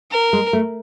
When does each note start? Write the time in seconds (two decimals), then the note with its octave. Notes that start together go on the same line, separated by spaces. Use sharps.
0.11 A#4
0.33 G#3
0.53 A3